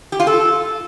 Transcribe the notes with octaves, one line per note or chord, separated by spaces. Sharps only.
G4
F4
A4